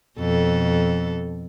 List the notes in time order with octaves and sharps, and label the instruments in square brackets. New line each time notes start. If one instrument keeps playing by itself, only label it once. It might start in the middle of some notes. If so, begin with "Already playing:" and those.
[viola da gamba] F2 B2 A4